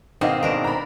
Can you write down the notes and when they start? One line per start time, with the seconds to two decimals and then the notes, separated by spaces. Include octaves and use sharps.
0.21 G#2 B2 D#3 A#3 C4 D#4 D#5 F5
0.43 G#2 B2 D#3 D4 A#4
0.64 A#5 B5